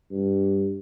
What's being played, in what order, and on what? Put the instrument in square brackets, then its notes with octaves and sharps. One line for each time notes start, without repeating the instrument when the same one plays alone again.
[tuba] G2